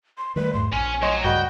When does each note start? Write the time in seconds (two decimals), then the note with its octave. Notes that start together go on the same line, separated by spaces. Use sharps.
0.18 C6
0.36 D#3 G3 A3 B4
0.53 E2 G#2 A3 C6
0.73 A#1 C#4 G#5
1.02 F#3 C#5 D#5 C6
1.24 C#2 G2 F#4 D#5 G5 B5